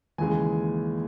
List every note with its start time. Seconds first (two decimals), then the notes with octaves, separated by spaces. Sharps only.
0.18 D#2 C#3 E3 G#3 G#5